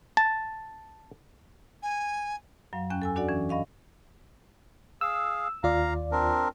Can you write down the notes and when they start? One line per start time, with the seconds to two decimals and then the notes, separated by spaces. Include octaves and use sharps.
0.17 A5
1.82 G#5
2.73 F#2 F#3 F5
2.90 E2 C#4 G5 F#6
3.02 A4 G#5 E6
3.16 D4 F#4 A4 D5 F#5
3.29 E3 C#4
3.49 G2 D#5 F5 C#6
5.01 G#4 F5 E6
5.63 D#2 F4 D5 F5 A#5
6.12 C4 D4 A#4